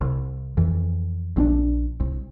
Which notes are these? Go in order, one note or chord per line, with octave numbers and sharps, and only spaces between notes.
C2
F2 E3
A#1 C4 D4
C2